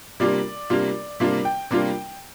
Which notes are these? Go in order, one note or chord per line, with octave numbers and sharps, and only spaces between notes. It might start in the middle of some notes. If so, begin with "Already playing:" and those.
C3 G3 A#3 D4 F4 D5
C3 G3 A#3 D4 F4
C3 G3 A#3 D4 F4 D5
G5
C3 G3 A#3 D4 F4